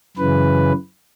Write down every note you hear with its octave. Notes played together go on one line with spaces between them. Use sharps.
F#2 C#3 E3 B4